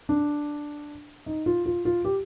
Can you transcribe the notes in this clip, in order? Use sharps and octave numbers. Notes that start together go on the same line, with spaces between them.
D4
D#4
F4
F4
F4
G4